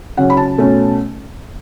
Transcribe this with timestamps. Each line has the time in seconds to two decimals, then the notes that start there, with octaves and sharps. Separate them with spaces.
0.17 C#3 F#3 C#4 F#5
0.30 B5
0.37 A5
0.58 B2 A3 C#4